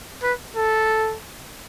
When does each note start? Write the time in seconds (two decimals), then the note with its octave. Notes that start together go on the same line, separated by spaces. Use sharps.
0.23 B4
0.56 A4